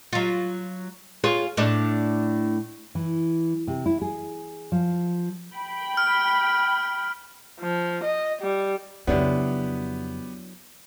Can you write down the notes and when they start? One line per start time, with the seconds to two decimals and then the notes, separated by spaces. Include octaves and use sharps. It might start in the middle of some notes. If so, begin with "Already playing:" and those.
0.13 F#3 F4
1.24 F4 G#4 C#5
1.57 A2 D4
2.95 E3
3.67 C3
3.86 E4
4.02 G#4
4.72 F3
5.55 G5 B5
5.97 F6
7.60 F3
8.03 D#5
8.42 G3
9.07 F2 C#3 F#3 B3 D4 E4 G4